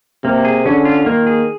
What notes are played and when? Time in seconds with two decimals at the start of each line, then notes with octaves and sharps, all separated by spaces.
0.24 C3 A#3
0.45 G#4
0.66 D3 C#4
0.85 F4
1.06 D#3 A#3
1.27 G#4